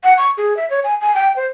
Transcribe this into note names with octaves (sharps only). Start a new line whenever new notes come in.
F#5
C#6
G#4
E5
C#5
G#5
G#5
G5
C5